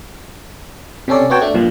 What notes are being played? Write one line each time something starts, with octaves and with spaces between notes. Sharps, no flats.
C3 C4 C#4 A4 D5
B3 C4 F#4 C#5 G5 A5
A3 D4
G2 A#2 F3 G3